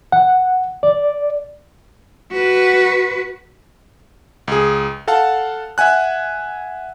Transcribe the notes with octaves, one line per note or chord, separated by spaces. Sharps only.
F#5
D5
F#4 B4
C#2 G#4
A4 F5 F#5 A5
E5 F#5 G#5 F#6